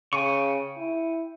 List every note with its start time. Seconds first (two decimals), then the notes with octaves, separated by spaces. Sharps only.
0.13 C#3 G5 G#5 C#6
0.78 E4